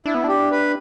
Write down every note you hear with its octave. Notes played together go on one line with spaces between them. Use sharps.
D4 E4
B3
D4 G4
B4